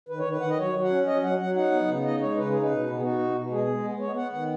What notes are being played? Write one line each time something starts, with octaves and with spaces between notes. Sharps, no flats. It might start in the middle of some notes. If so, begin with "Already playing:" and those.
D#3 B4
C#5
D#3 B4
D#3 F#5
D#5
F#3 C#5
F#3
F#5
C#4
F#3 D#5
F#3 F#5
F#3 F#5
D#4 F#5
B3
C#3
D#4 D#5
G#3 C#5
C#3 B4
D#4 G#4
B4
B2
B3
G#4
D#4 F#4
B2
B2
G#3 G#4
G#3
B3
B3 C#5
B3 F#5
D#3 F#5